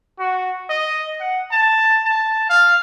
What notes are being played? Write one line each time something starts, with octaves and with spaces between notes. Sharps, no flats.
F#4
D#5
F#5
A5
A5
F5